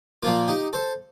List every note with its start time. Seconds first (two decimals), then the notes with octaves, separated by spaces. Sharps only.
0.23 A#2 F3 A#3 F4
0.48 D#4 G4
0.73 A4 C5